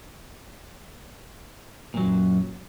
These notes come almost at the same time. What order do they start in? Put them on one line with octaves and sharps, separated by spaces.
A#2 F#3 F#2